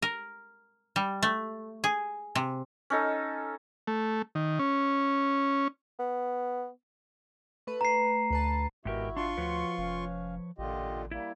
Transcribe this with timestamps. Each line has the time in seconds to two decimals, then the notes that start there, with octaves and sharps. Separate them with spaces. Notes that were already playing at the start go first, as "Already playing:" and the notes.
0.02 A#4
0.96 G3
1.23 A3
1.84 G#4
2.35 C3
2.90 C#4 D#4 A4
3.87 A3
4.35 D#3
4.59 C#4
5.99 B3
7.67 A3 B4
7.81 A#5 C7
8.31 D2 B4 A5
8.85 G#1 G#2 B2 E4 F#4 G4 A#4 E5
9.17 D4 F4 C6 C#6
9.37 D2 F3 F#4 B4 C#5
9.78 F1 C#4 F5
10.58 A1 A#2 D3 F4 G4 D#5
11.11 G3 A#3 E4